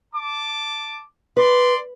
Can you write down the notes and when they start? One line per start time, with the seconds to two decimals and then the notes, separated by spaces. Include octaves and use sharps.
0.13 A5 D6
1.37 B4 D5 C6